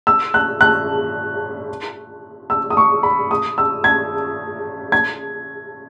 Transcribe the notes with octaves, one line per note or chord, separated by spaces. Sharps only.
E6
F#6
F#6
E6
D#6
C#6
B5
D#6
E6
G#6
G#6